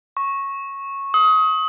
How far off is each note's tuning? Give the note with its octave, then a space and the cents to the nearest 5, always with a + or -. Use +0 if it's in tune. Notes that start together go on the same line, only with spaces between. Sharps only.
C#6 -10
D#6 +30